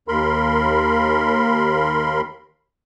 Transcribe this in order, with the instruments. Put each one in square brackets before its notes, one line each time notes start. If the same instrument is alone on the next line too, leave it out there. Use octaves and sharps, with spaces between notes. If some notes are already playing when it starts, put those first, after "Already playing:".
[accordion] D#2 A#4 B5 C6